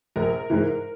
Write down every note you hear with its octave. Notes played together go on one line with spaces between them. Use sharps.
A#1 A#4
G#2 E3